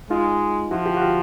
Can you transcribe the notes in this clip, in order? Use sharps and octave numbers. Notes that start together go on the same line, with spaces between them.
G#3 D#4 F4
F3 E4 F#4
F4 G4
F#4
F4 G4